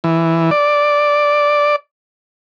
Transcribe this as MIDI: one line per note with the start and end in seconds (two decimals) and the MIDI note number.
0.04 0.50 52
0.51 1.76 74